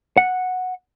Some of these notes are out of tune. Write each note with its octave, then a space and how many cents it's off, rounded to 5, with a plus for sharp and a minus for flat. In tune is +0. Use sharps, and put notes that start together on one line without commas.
F#5 -5